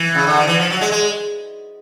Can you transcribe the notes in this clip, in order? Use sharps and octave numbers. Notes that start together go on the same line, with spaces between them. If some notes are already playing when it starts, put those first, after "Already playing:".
Already playing: E3
C#3
D3
D#3
E3
F3
F#3
G#3
G#3